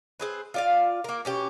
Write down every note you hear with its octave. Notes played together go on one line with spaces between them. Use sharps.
C4 G#4 B4
F4 D5 F5
A#3 A#4
B2 C#4 G4